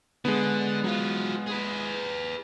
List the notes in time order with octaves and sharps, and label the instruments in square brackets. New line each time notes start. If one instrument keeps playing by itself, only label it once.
[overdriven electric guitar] D3 [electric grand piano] G#3 B3
[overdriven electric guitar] F#3 F4
G#4 B4